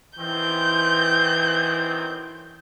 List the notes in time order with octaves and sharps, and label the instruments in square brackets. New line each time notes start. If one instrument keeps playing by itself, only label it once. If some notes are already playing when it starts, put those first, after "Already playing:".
[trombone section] F#2 D#3 C4 [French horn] E3 [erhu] G6